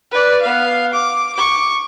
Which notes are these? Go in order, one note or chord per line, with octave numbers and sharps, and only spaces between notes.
B4 D5
B3 F5
D6
C#6 D6